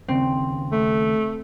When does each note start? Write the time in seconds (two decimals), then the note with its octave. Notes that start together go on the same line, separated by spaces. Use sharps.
0.08 D#2 C#3 C4
0.72 A3